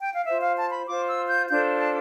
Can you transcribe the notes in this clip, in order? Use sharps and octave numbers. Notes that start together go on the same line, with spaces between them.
G5
F5
F4 C5 E5
F5
A5
B5
F4 C5 D6
E6
G6
D4 F4 A4 C5 G6
A5